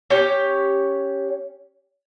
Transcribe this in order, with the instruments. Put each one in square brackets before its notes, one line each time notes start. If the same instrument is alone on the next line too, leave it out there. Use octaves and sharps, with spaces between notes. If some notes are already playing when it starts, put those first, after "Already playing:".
[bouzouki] C#4 G4 C#5 G5